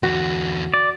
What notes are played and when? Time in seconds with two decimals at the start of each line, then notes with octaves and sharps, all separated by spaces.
0.03 E2 D3 F#4
0.74 D5